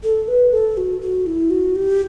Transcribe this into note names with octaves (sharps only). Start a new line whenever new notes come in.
A4
B4
A4
F#4
F#4
E4
F#4
G4